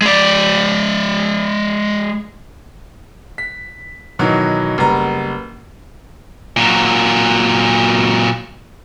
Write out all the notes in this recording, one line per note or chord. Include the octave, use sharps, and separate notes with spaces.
G#3 D5
B6
B2 D#3 E3 F#3
F#1 G3 B3 A#5
A#2 F#3